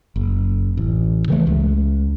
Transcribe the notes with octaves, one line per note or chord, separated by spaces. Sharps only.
F#1
A1
C#3 E3 A3
C#2